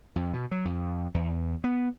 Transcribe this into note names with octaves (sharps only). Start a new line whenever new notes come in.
F2
B2
F#3
F2
E2
B3